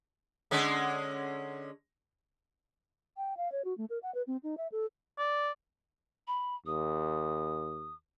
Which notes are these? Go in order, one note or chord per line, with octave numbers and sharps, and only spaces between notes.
D3 G#3 C#4
G5
F5
C#5
F#4
A3
A#4
F#5
B4
C4
D#4
E5
A4
D5
B5
D#2 D#6